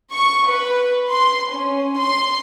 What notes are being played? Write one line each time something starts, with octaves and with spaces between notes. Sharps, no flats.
C#6
B4
C6
C#4
C6